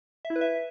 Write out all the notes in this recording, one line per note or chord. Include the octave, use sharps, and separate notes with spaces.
E5
E4
B4
E5